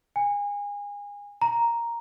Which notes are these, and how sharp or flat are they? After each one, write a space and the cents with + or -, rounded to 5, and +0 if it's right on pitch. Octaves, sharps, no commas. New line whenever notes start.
G#5 -30
A#5 +0